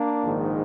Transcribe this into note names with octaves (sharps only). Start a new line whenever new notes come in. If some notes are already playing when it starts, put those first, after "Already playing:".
Already playing: A#3 D4
A#1 G#2 D#3